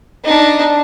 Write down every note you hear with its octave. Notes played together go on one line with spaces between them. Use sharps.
D4 D#4